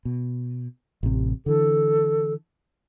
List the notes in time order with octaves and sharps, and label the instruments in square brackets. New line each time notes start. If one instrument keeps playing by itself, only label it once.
[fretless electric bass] B2
A1 C3
[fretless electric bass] D3 E3 [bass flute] A4